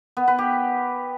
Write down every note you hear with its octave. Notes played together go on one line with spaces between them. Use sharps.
B3
B4
G4